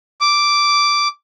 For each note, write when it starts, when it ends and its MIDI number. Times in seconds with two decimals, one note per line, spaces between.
0.21 1.08 86